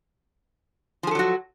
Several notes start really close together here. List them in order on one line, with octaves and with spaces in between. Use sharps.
F3 G#4 A4 F#3 F#4